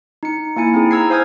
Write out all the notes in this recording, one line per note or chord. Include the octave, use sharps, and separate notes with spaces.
D#4 C#7
A#3 E4 G#5 C#7
C4 D#4 E4 G#4
A#5 E6 G#6 C7
C5 F5 G#5 D#6 F6 G#6